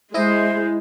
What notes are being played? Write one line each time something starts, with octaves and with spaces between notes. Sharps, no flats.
G#3 E4 C5 D#5